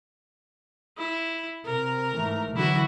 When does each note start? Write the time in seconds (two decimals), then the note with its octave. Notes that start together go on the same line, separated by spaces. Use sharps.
0.98 E4
1.65 C3 A#4
2.13 G#2 E3 A3
2.56 D3 E3 F#3 E4 F#4